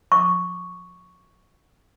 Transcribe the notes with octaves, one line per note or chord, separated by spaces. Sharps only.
C#6 D6